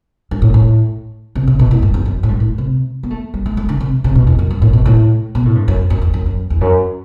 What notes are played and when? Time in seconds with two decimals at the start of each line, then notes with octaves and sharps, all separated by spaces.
0.31 G2
0.42 A2
0.54 A2
1.35 C3
1.47 C3
1.59 B2
1.71 A2
1.82 G2
1.94 E2
2.06 F#2
2.23 A2
2.28 G2
2.40 A2
2.58 C3
3.03 B3
3.10 A3
3.34 G3
3.46 A3
3.57 A3
3.69 D3
3.81 C3
4.04 C3
4.15 B2
4.27 E2
4.39 F#2
4.51 G2
4.62 A2
4.73 B2
4.86 A2
5.35 B2
5.45 A2
5.55 G2
5.68 F#2
5.90 F#2
6.02 E2
6.14 F#2
6.26 F#2
6.50 E2
6.61 F#2